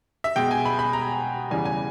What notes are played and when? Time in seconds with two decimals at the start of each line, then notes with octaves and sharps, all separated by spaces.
0.24 E5
0.36 B2 G#3 G5
0.51 G#5
0.65 B5
0.79 B5
0.93 A#5
1.51 E2 C#3 E3 G3 G#5
1.65 G#5